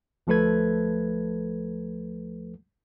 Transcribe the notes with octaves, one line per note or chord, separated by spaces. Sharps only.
D2 F3 A3 A4 B4 G#6